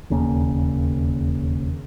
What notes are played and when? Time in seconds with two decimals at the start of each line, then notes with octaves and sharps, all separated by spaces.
0.10 E1 D#2 C#3 A#3